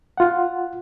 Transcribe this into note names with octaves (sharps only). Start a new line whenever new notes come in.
F4 F#5